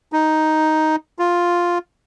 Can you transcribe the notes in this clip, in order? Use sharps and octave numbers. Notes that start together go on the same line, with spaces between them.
D#4
F4